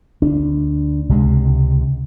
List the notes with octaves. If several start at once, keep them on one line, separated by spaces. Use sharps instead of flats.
D2 D4
C#2 C3 E3 G#3